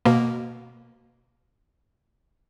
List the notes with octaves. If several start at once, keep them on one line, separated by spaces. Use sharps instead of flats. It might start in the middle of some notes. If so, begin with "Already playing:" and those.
B2 A#3